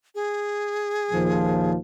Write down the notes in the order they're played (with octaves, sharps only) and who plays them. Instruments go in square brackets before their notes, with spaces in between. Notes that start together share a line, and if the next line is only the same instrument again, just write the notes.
[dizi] G#4
[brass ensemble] D#2 A#2 F3